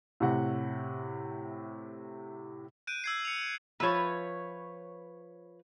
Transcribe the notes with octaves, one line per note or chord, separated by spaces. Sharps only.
A2 C3 F#5
F#6 G6 D7 D#7
E6 G#6 C7
C#7 F7
F3 B4 C#5 E5